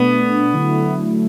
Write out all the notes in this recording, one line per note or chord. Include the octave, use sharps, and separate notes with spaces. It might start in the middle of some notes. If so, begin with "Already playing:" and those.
Already playing: B2 A3 B3 D4
D3 F#3 A3 E4